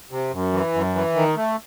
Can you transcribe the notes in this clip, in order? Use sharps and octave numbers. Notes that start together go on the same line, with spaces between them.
C3
F#2
E3
F#2
E3
D#3
A3